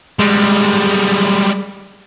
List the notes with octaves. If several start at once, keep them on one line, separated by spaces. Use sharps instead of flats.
G3 G#3